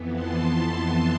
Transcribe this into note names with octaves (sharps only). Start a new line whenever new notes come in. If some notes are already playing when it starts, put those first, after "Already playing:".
Already playing: F2 E3 B3
A5 C6
A5 C6